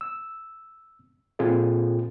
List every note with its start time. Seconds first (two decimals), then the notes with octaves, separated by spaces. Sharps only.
0.01 E6
1.39 A#2 C4 F4 G#4 A4